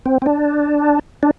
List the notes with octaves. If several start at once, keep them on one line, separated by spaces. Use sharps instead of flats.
C4
C4
D4
D4